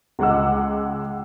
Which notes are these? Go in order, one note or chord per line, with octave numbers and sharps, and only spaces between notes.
C#2 G#3 F#5 D6 E6